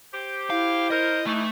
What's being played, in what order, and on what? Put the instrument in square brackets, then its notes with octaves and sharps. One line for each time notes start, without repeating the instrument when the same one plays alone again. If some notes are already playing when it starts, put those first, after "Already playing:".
[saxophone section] G4 C5
[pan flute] E4 [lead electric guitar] F5
[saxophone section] A#4 C5 [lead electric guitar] D#5
[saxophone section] E3 D#4 [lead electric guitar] A3